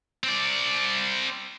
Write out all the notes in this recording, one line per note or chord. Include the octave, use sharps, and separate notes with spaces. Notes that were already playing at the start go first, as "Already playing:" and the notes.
C4 D5